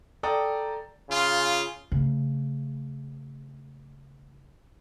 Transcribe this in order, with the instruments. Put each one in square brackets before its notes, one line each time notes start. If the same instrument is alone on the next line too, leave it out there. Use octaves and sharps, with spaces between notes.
[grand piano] A4 D5 G5 A#5 D#6
[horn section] C#3 F4
[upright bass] C#3 A3